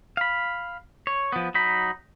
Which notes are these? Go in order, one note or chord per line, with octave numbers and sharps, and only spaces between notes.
F5 B5
C#5
F3 B3
F#3 D#4 B5